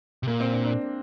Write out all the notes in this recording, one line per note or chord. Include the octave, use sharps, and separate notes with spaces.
C3
A#2 A#3
C4
D4
D4